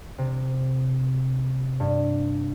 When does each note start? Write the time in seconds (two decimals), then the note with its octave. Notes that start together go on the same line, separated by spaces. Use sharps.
0.18 C3
1.80 G2